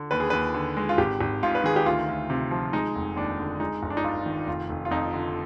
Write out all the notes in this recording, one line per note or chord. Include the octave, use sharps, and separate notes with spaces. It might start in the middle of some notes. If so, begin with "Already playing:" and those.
Already playing: D3
D#2 B4
G#4
D#2 B4
D3
G#3
F4
G#1 G4
G#1
G#2 F4
B4
D#3 G#4
G4
D2 F4
D2
C3
F3
G#3 D#4
F1
D#2 D4
D3
G#3 D#4
G1
D4
D#4
G2 F4
D#3
F1 F4
F1
F4
F2 D#4
D3